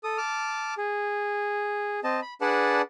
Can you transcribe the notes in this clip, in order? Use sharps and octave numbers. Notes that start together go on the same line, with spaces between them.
A4 D#6
A5 D6 F6
G#4
C4 D#5 A5
B5
D4 G#4 B4 D5 F#5 A5